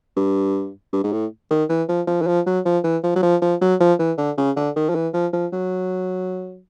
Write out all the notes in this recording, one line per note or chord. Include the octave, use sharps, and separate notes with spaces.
G2
G2
G#2
A2
D#3
E3
F3
F3
E3
F3
F#3
F3
E3
F3
F#3
F3
F3
F#3
F3
E3
D3
C#3
D3
D#3
F3
E3
F3
F3
F#3